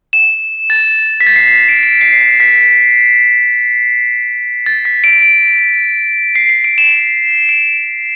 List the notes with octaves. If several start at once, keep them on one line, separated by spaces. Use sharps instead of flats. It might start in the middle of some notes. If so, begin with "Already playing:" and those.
E7
A6
B6
A6
C7
B6
C7
D7
D7
C7
C7
B6
A6
B6
D7
D7
C7
D7
D7
E7
D7